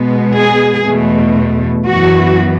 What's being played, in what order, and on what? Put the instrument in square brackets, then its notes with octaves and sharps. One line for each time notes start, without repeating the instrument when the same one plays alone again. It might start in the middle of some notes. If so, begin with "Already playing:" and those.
Already playing: [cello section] B2 G#3 B3
G#4
E2 B2 A3
F#2 E3 B3 F#4